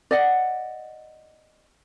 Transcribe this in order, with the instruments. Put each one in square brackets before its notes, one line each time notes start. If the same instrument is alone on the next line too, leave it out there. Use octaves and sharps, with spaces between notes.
[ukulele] D5 D#5 F#5